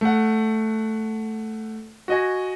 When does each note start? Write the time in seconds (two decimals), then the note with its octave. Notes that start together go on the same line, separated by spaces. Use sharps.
0.01 A3 F#5
2.08 F#4 D#5 G#5